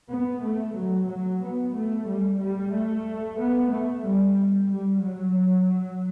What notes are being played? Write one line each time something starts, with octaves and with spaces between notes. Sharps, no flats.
B3
A3
F#3
F#3
B3
A3
G3
G3
A3
B3
A3
G3
G3
F#3